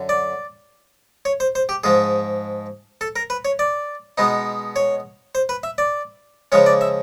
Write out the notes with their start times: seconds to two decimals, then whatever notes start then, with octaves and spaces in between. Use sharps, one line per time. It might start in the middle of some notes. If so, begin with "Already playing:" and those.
Already playing: F#2 D3
0.09 D5
1.25 C#5
1.40 C5
1.55 C5
1.69 G4
1.84 G#2 F3 G#3 G#4
3.01 A4
3.16 A#4
3.30 B4
3.45 C#5
3.59 D5
4.18 B2 G#3 B3 D#4
4.76 C#5
5.35 C5
5.49 B4
5.63 E5
5.78 D5
6.52 C#3 F3 G#3 C#4 C#5
6.66 D5
6.81 E5